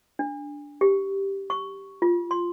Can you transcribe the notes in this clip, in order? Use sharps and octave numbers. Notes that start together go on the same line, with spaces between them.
D4
G4
C#6
F4
C6